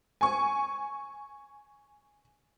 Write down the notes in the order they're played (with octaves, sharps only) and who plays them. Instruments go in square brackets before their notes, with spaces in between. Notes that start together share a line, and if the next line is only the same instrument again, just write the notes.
[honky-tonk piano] G#5 C#6